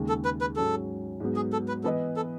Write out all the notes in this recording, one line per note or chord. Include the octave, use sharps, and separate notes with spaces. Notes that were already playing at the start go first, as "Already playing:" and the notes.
Already playing: D#2 C#3 G#3
A4
B4
B4
G#2 F#3 C#4 F#4 A4
G#2 F#3 B3
G#4
A4
B4
E3 B3 E4 A4 B4 D#5
A4